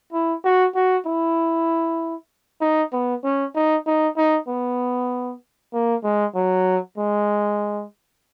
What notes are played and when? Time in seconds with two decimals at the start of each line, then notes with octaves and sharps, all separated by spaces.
0.13 E4
0.44 F#4
0.75 F#4
1.06 E4
2.61 D#4
2.93 B3
3.24 C#4
3.55 D#4
3.86 D#4
4.17 D#4
4.48 B3
5.73 A#3
6.04 G#3
6.35 F#3
6.98 G#3